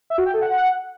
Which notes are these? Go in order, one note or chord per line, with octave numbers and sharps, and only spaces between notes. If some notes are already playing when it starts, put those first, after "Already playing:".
E5
F#4
G5
A4
F#5